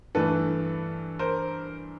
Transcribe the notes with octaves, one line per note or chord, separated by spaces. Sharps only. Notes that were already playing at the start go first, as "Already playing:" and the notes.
G2 E3 A3 A4 B4
A#4 C5